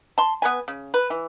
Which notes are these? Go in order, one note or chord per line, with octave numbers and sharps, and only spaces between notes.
A5 C6
B3 B4 G#5
C#3
B4
E3